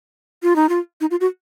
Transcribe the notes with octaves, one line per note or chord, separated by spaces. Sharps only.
F4
D#4
F4
D#4
F4
F#4